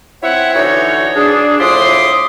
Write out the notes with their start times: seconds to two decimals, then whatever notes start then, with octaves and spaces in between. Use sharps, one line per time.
0.22 C4 E4 C#5 E5 F#5
0.54 D3 E3 D#4 F#4 C#5
1.16 D4 G#4
1.60 A2 F3 E5 C6 D6 D#6